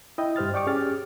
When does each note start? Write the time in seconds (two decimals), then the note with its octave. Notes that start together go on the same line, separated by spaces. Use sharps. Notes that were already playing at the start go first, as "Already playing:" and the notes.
0.18 E4 D#5 G5
0.36 G2 G4 C5 F6 A6
0.54 D5 G5 C#6 D6
0.66 C#4 G4 G#4 F6 A6